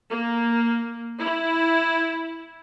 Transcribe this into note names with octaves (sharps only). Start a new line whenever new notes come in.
A#3
E4